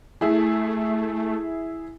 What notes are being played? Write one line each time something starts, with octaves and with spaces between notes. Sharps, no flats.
A3 E4 G#4